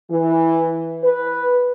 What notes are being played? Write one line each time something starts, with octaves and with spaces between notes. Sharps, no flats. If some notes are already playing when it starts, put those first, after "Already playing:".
E3
B4